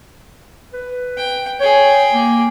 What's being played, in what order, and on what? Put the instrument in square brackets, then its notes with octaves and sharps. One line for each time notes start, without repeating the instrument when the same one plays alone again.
[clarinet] B4
[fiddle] G5
[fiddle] G#4 G5 [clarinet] C#5
[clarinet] A#3